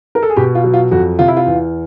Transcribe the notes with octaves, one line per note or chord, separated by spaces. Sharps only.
A#4
A4
G#4
B2 G4
F4
F#3
F4
F2 F#4
C3 F4
E4
F4
E2